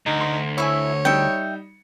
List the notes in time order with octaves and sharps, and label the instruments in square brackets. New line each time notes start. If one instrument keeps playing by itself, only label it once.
[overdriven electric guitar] D2 [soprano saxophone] D#4
[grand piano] C6 A#6 D7
[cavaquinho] E4 E5 [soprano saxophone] C#5 [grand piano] G#5 C#6 E6
[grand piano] G3 D#4 C#7 [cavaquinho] E5 G5